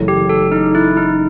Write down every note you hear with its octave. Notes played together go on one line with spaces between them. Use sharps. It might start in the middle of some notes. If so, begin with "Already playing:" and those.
Already playing: F#1 F#2 E3 A3
G4
A4
D#4
E4
D#4